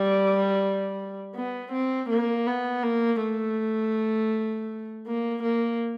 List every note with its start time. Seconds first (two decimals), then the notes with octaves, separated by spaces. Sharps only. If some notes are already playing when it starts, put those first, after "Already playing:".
Already playing: G3
1.36 B3
1.72 C4
2.10 A#3
2.47 B3
2.83 A#3
3.21 A3
5.07 A#3
5.43 A#3